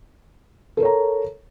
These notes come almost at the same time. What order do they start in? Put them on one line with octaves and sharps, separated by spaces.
A4 A#4 C#5 A#5